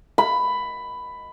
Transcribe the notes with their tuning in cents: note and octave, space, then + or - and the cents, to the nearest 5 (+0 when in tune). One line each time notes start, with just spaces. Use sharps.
B5 +10